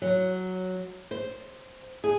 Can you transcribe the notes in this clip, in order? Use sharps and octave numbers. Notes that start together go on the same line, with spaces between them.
F#3
C5
G#4